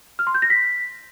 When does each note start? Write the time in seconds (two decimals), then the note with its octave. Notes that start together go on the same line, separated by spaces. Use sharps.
0.19 F6
0.27 C6
0.34 G6
0.42 A#6
0.50 B6